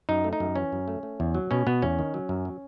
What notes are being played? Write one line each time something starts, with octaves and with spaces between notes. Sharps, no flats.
F#2 D#4
A3
D#4
F#2
E3 C#4
F#2
A3
A3
E2
F#3
B2 C#4
B2 B3
E2 C#4
D#3
F#3
F#2
F#3